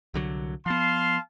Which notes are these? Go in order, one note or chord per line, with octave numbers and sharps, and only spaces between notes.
C2 D3 F#3
F3 B3 F5 A5 C6